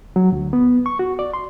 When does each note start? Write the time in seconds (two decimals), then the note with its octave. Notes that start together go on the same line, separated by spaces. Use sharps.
0.16 F#3
0.32 D2
0.53 B3
0.86 C#6
0.99 F#4
1.19 D5
1.33 C6